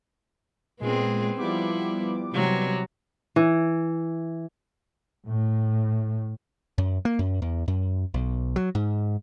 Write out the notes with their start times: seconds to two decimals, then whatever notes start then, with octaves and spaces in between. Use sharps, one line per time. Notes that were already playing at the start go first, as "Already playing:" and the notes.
0.80 A#2 G#3 B3 C4 G#4
1.38 F3 G3 B3 E4 D6
2.33 C3 F#3
3.36 E3
5.26 A2
6.78 F#2
7.05 A#3
7.19 F#2
7.42 E2
7.68 F#2
8.14 B1
8.56 F#3
8.75 G#2